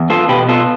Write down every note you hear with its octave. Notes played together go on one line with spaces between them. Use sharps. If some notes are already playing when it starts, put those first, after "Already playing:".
Already playing: E2
B3 F4 A4
B2 G4 B4
B3 F4 A4